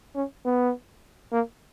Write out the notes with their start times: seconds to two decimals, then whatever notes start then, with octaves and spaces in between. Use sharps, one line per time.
0.15 C#4
0.45 B3
1.32 A#3